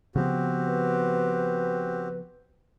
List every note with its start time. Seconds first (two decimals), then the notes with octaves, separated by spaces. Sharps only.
0.16 C#3 F3 B3 C4 F#4 G4
0.66 B4